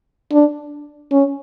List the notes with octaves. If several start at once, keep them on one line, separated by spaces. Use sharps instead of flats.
D4
C#4